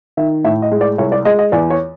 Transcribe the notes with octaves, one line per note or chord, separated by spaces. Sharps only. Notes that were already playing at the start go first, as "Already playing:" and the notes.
D#3 E5
A2 E5
D#5
G#3
D5
C2 C#5
D5
G#3 D#5
D#5
E2 D5
C#5